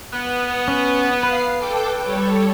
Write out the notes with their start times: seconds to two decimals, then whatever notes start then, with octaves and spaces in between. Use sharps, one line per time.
0.13 B3
0.68 C#4
1.23 B4 F5 C7
1.58 A4 G5 D6
2.03 G3 A4 C#5